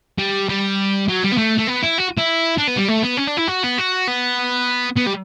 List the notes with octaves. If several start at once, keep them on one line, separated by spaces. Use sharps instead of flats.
G3
G3
F#3
G3
B3
A3
A3
B3
E4
F#4
E4
D4
B3
G3
A3
B3
C#4
D4
E4
F#4
B3
F#4
B3
B3
G3